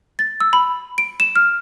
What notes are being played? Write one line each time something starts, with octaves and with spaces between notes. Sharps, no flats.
A6
E6
B5
D7
E7
F6